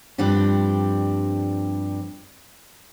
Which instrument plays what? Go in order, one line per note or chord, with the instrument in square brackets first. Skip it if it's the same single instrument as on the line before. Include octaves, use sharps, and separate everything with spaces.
[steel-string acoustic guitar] G2 F3 G3 C4 D4 G4